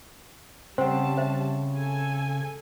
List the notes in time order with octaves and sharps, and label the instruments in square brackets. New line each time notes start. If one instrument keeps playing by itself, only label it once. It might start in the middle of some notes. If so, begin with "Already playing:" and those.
[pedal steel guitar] C#3 [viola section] G3 A5 [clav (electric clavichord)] C4 [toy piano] C5 F#5
[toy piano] C5 E5
[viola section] A4 G#5